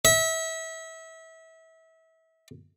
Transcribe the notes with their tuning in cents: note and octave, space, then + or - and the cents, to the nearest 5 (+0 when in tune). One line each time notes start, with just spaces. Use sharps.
E5 -30